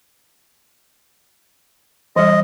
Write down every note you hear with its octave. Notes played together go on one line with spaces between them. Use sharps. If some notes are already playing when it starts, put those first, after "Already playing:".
E3 G3 D#5